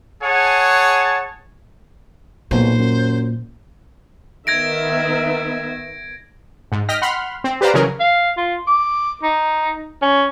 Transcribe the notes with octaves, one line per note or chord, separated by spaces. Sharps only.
G#4 C#5 F#5 G#5 A5
B1 A#2 C5
F#2
D#3 B3 E5 G#6 A#6 D7
G#2
D#5 G5 F6 A#6 B6
F#5 B5 C6 F6
C4
G4 B4 C5 D5 F5 A#5
C#3 E3 F#3 C#4 G#4 A#4
F5
F4
D6
D#4
C#4